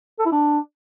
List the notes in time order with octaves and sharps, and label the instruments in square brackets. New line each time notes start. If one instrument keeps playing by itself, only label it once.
[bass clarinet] A4
E4
D4